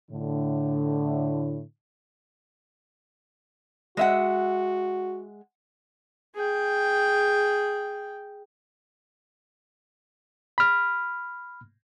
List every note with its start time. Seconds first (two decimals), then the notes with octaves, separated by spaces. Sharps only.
0.11 A2 D3
3.97 G#3 F#4 E5 F#5
6.35 G#4 G5
10.58 B5 F6